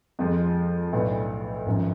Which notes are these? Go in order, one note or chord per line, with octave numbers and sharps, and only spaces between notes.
F2 F3 G#3
B1 A2 F#3 B3 D4
G#1 F#2 F3